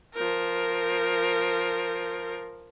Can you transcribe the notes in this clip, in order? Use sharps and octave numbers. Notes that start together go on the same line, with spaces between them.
F3 A#4